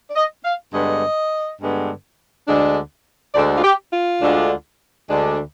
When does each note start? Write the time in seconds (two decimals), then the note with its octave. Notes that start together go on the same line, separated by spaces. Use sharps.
0.10 D5
0.16 D#5
0.45 F5
0.74 G2 D3 G#3 B3 D#5
1.61 G2 D3 G#3 B3
2.48 D2 D3 G#3 D4
3.35 D2 D3 G#3 D4 D5
3.57 F4
3.64 G4
3.93 F4
4.22 D2 D3 G#3 D4
5.10 D2 D3 G#3 D4